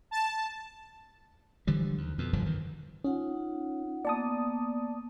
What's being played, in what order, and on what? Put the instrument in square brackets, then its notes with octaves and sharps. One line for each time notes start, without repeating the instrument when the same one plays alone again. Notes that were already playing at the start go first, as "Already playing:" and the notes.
[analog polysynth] A5
[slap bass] D3 E3 F3 G3
D#2
F2 B2
F1 G2 D3 F3
D#3 E3
[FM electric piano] C#4 [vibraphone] D#4 F4 F#5
[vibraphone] A#3 B3 [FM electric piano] D5 A5 D#6